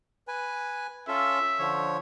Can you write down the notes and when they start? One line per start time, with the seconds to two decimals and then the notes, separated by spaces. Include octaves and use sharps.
0.28 B4 G#5
1.08 C#4 F4 A4 E5
1.59 D3 F3 C#5